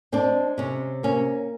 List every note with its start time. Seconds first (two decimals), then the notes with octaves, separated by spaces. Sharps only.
0.12 G#3 C4 D4
0.58 C3 C#4
1.03 A#3 C#4